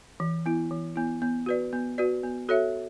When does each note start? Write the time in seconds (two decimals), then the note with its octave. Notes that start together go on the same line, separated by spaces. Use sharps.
0.20 E3
0.46 B3 E4
0.71 E3
0.96 B3 E4
1.22 B3
1.46 F#4 B4 D5
1.73 B3
1.98 F#4 B4 D5
2.23 B3
2.49 F#4 A4 C#5 E5